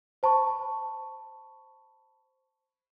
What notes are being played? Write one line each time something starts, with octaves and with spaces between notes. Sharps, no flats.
C5 A5 B5 C#6